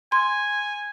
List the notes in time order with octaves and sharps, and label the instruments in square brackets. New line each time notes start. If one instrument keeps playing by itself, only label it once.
[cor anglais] G#5 [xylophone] C6